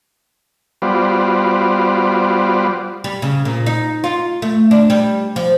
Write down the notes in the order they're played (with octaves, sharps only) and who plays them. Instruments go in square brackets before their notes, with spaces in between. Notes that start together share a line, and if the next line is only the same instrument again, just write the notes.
[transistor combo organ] G3 B3 F4 F#4 C5 D5
[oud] G3
C#3
A#2
D#4
F4
A3
D4
G3
F3